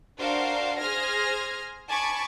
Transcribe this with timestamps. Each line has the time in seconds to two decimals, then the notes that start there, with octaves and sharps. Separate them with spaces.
0.18 D4 F#4 A#4 C5 F5
0.80 G#4 C5 F6 G#6 A#6
1.89 G#5 A5 B5 C#6 D6